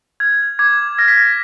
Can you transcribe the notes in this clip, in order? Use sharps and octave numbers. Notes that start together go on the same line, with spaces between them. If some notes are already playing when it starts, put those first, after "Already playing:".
F6 G#6
D6 G#6
F6 A#6
B6
A#6